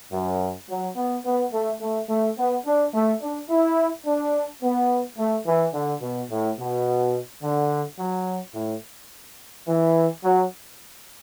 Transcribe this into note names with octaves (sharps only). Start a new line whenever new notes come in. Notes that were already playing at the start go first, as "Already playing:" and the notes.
F#2
F#3
B3
B3
A3
A3
A3
B3
D4
A3
D4
E4
D4
B3
A3
E3
D3
B2
A2
B2
D3
F#3
A2
E3
F#3